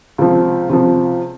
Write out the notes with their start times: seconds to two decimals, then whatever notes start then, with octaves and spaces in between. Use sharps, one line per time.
0.18 C#2 C3 F3
0.69 C#2 C3 F3